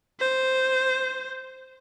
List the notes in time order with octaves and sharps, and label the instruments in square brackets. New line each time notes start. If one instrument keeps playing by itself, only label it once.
[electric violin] C5